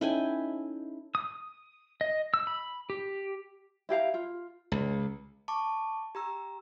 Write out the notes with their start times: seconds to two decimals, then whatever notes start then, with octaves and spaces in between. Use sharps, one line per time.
0.01 C#4 D#4 E4 A4 G5 G#5
1.15 D#6
2.01 D#5
2.34 E6
2.47 B5
2.90 G4
3.89 E4 G4 F5 A#5
4.14 F4
4.72 C#2
5.48 A5 C#6 D6
6.15 G4 A#5 E6